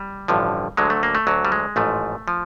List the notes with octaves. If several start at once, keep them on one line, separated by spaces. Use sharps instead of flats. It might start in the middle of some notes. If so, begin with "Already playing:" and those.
Already playing: G3
A1 G2 D3 F3
D2 D3 F#3 G#3
A3
A#3
A3
D2 D3 F#3
G3
G#3
A1 G#2 F3 A3
F3